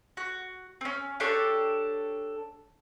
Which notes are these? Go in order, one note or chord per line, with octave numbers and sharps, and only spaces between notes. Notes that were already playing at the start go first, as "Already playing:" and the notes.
F#4
C4 C#4
D4 G4 A4 C#5